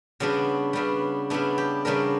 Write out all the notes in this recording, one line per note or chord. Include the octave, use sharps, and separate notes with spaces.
C#3 G3 B3 D4 F#4
C#3 G3 B3 D4
C#3 G3 B3 D4 E4
G4
C#3 G3 B3 D4 A#4